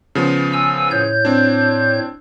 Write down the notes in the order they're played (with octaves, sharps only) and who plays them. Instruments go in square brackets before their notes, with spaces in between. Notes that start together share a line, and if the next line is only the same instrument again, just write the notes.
[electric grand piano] C#3 F3 B3
[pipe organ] G#5 E6
A2 C#5 G6
[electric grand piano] C4 D4